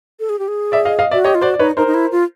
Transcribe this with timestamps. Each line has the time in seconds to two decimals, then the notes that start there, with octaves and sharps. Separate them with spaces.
0.20 A4
0.29 G#4
0.39 G4
0.48 G#4
0.72 D5 E5
0.85 D#5 F5
0.99 D#5 F5
1.11 F#4 D5 E5
1.24 G4 C#5 D#5
1.35 F4
1.41 F#4 C5 D5
1.54 D5
1.59 D#4 B4 C#5
1.77 D#4 A#4 C5
1.87 D#4
1.94 E4
2.12 F4